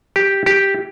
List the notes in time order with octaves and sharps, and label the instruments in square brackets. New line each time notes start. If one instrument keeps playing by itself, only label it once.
[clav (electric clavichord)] G4
G4